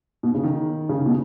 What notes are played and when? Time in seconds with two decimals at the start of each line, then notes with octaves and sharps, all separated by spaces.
0.23 B2
0.34 C#3
0.43 D#3
0.89 C#3
1.06 B2